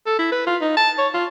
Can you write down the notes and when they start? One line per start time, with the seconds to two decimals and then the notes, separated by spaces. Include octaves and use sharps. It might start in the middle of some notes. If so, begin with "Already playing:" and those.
0.06 A4
0.19 E4
0.32 B4
0.47 F4
0.61 D#4
0.77 A5
0.98 C#5
1.14 F4